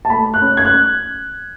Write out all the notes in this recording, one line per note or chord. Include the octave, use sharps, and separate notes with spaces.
A5
A3 B5
F#6
C#4
G#6
F#6